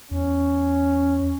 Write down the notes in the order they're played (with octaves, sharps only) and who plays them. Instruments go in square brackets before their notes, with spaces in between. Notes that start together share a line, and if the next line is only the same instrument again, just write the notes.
[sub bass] E2 [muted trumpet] C#4